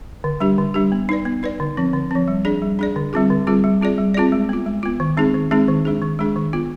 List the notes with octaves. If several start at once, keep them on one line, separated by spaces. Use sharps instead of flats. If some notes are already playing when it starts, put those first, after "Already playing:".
D3
G3 D4 G4
D3
G3 D4 G4
B3
D#4 B4 D5
B3
D#4 B4 D5
D3
F3 C4
D3
F3 C4
G3
D4 G#4 D5
G3
D4 G#4 D5
D3
G3 C4 F4 G#4
D3
G3 C4 F4 G#4
G3
C4 F4 G#4 D5
G3
C4 F4 G#4 D5
G#3
B3 F4
G#3
B3 F4
D#3
G#3 C4 D#4 G#4
D#3
G#3 C4 D#4 G#4
D#3
G#3 D4 G#4
D#3
G#3 D4 G#4
D#3
B3 F4